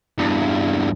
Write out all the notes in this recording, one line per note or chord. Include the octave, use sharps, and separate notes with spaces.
E2 G2